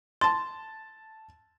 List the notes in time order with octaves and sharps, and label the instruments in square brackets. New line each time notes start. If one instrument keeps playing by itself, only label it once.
[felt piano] A5 A6 [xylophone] C6